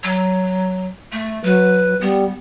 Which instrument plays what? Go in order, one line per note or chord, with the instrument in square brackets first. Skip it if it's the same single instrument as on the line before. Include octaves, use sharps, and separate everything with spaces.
[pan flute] F#3
A3
[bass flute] F#3 [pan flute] B4
[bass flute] G3 [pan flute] B3